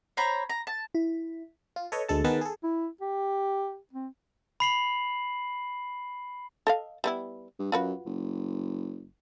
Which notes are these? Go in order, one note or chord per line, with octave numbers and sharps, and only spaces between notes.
C5 C#5 A#5 B5
A#5
A5
E4
F4
A4 B4 C#5 D#5
D2 G#3 A4 A5
D#3 B3 G#4 A#4 B4 A5
G#4 A4
E4
G4
C4
B5 C7 F#7
A4 D#5 F5
G3 B3 E4
G2
F#2 F4 F#4 B4
F#1